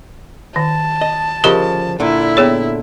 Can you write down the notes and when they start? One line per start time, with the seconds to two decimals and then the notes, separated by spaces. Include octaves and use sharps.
0.56 D#3 A5
1.01 D#5
1.44 D2 C#3 F3 G4 A#4 D#5
2.00 A#2 D3 E4
2.37 B3 G#4 C#5